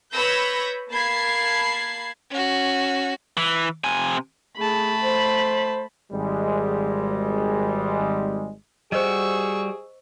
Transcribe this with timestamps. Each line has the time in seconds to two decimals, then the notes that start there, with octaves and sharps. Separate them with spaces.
0.13 B4 C#5 B5 E6 G6 A#6
0.90 A#3 A5 B5 G#6 C7
2.30 C#4 F#4
3.37 E3
3.84 C3 G#5
4.58 A3 G#4 A5 B5
5.02 C5
6.12 G#1 G3 G#3
8.92 G3 F#4 G#4 C5 D#5 C#6 E6